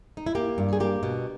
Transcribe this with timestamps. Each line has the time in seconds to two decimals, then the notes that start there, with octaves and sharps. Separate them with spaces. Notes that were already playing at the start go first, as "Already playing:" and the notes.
0.17 D#4
0.26 E4
0.35 A#3 G4
0.58 G2
0.73 G#4
0.80 A#3 G4
1.03 B2